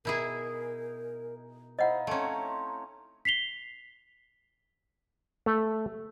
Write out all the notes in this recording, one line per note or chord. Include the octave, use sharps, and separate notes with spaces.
B2 D#4 E4 G#4 A#4
D#4 E4 C5 D#5 F5 F#5
A3 C4 C#4 C#5 A#5
B6 C7 F7 G7
A3